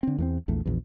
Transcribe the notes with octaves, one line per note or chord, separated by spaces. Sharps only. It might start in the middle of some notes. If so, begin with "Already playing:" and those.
D3 C4
E2 A3 C4
A#1 E2 A3
A#1 E2